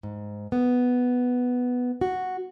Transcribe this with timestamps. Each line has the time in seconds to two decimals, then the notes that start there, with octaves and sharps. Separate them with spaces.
0.03 G#2
0.52 B3
2.01 F#4